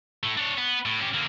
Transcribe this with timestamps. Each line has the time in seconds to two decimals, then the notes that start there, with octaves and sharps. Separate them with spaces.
0.23 A2 A3
0.37 D4 C#5
0.57 B3
0.85 A2
1.00 C#4 G4
1.14 D3 A#3